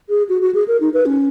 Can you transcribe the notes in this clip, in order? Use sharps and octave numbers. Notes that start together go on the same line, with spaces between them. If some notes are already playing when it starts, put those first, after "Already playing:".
G#4
F#4
F#4
G#4
A#4
D#4
B4
C#4